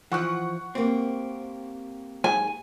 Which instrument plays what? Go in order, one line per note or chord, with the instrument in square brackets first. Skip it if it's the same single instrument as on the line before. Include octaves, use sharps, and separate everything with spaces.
[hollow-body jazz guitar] E3 F3 [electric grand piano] F#5 C#6 F#6
[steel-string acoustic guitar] A#3 G4 [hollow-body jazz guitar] C4
[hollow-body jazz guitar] G#2 [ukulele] G#5